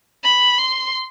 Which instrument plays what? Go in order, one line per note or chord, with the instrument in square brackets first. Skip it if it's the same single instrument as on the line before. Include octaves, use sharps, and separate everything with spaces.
[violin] B5
C6